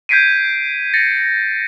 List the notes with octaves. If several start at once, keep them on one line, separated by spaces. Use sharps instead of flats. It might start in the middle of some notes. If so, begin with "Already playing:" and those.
G6 G#6 B6 C7 D7 D#7
A6 A#6 C#7